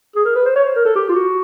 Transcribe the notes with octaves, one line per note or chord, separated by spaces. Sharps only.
G#4
A#4
B4
C5
C#5
C5
A#4
A4
G4
F4
F#4